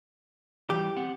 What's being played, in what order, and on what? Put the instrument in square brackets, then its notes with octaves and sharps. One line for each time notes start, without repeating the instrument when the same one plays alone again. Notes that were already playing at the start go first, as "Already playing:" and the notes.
[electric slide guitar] E3 G3 [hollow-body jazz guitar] G4
[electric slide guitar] C4 F#5